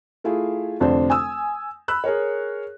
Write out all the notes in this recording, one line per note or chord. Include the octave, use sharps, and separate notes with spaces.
A3 E4 F4 G#4
F1 F2 D3 D4 C5
G#5 D#6 E6
B5 E6 F#6
G#4 A#4 C#5